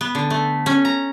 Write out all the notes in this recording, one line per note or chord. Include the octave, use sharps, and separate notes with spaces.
B3
D3
A3
C#4
A#5